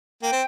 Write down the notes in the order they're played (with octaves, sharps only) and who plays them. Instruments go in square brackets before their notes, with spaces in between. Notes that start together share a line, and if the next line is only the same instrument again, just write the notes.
[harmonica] A#3 [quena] G5
[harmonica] C4